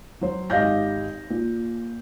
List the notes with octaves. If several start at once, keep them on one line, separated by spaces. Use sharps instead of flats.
F#3 C5
G#1 G4 D#5 F5 G6 A#6
A#2